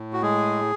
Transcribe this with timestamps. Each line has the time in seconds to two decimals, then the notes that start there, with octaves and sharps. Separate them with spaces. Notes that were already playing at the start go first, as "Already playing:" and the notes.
Already playing: A2
0.13 F#4
0.22 G#3 G#4